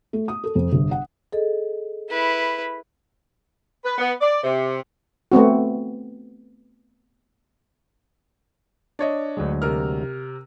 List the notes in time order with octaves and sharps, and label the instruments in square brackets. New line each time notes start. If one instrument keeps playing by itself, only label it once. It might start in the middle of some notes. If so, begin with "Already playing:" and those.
[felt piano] A3
D#6
A4
F2
G1
F#5
[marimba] G#4 A4 D#5
[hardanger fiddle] E4 B4
[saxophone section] B4
B3
D5
C3
[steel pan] A3 B3 C4 F#4
[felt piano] D4 C#5 D#5
[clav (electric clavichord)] D2 F#3 G#3
[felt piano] C3 A#4 F6